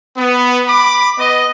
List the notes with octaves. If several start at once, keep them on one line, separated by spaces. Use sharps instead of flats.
B3
B5 D6
B3 D#5